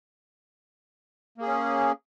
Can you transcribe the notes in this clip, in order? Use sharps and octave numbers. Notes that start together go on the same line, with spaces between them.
A#3 C#4 G#4